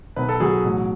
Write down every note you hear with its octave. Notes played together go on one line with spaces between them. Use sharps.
B1 B4
A4
F#3 G#4
A1